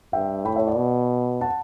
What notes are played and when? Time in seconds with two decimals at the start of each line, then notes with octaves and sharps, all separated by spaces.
0.13 G2 E5 G5
0.45 A2 G5 B5
0.56 C#5 E5
0.67 D5 F#5
0.77 B2
1.41 F#5 A5